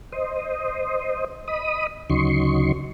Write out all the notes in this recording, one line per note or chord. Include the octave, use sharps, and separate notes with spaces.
C5 D#5
D#5 B5 D#6
D2 C#3 F#3 D#4 C6 C#6